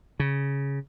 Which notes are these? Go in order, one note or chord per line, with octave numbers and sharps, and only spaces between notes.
C#3